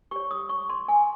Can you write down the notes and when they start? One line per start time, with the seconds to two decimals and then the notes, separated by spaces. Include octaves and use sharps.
0.11 G4 C#5 C#6
0.31 D#6
0.49 C#6
0.69 C6
0.88 G#5